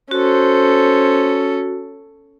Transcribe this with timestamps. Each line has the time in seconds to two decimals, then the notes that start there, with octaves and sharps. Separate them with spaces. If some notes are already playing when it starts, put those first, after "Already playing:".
0.11 C#4 F#4 A4 C5